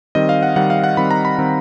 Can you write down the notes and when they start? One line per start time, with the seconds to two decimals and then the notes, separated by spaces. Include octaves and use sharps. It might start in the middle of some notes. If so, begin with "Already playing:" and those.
0.15 D#3 G3 C4 D#5
0.29 F5
0.43 F#5
0.56 D#3 G3 C4 F#5
0.70 F5
0.84 F#5
0.97 D#3 G3 C4 B5
1.11 A#5
1.25 B5
1.38 D#3 G3 C4